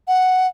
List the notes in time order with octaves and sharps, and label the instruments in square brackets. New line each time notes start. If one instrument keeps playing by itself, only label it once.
[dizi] F#5